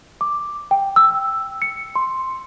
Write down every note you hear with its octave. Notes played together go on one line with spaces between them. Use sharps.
D6
G5
E6
C#7
C6